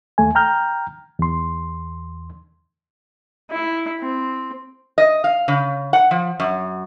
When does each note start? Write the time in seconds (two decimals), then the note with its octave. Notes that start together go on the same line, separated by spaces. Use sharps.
0.18 D#2 A3 G#5
0.35 G5 A#5 F6 G6
1.19 E2 C6
3.51 E4
4.01 C4
4.98 D#5
5.24 F5
5.48 C#3
5.93 F#5
6.11 F3
6.40 F#2